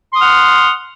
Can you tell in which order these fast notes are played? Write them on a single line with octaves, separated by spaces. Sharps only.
C6 D#6 F6 F#5